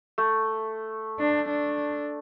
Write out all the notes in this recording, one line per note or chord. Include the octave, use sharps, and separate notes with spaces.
A3
D4
D4